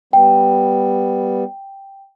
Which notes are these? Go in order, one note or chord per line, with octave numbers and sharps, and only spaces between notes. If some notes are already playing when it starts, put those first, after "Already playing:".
G3 B3 G5